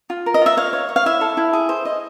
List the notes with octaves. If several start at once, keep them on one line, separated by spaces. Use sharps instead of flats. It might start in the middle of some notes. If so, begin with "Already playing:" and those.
F4
A#4
D#5
F4 E5
C#5 F5
C#5
C#5
F5
E4 E5
A4
E4
G#4
C5
D#5